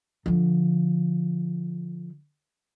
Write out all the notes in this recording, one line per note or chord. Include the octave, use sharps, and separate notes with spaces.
D3 F3